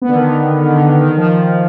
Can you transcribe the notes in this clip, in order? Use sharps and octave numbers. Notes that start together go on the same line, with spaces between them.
B3
D3
D#3
D3
D3
D#3
D3
D3
D#3
F3